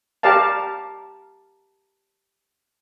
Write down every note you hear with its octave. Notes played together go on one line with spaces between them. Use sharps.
G4 A#4 D5 F5 A5